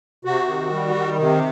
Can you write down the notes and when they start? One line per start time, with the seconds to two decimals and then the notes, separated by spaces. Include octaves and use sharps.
0.25 C3 F#4
0.48 D#3
0.72 G3
0.95 D#3
1.19 C3